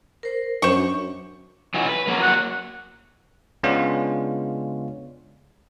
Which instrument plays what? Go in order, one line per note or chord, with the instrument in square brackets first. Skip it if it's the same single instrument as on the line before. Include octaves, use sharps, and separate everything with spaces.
[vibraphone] A#4 C5
[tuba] F#2 [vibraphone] D4 [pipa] C5 C#6
[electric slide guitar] E3 F#3 D#4
B4
F#3 A#3
[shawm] F#5
[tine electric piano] C#3 G#3 B3 C#4 D4 F4